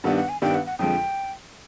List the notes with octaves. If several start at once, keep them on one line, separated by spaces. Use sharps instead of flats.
G2 D#3 G3 B3 D4 F#5
F#5
G#5
G2 D#3 G3 B3 D4 G5
F#5
F#5
F2 D3 F3 G#3 G5